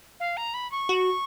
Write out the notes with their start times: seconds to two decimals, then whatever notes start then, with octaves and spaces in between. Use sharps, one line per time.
0.20 F5
0.37 A#5
0.54 B5
0.72 C#6
0.89 F#4